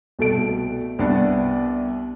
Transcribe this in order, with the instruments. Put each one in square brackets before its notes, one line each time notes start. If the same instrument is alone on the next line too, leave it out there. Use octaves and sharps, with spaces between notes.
[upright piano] C2 B2 A3 A4 D7
C2 B3 D4